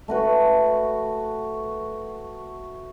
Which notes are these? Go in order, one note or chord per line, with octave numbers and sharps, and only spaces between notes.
A3 F#4 B4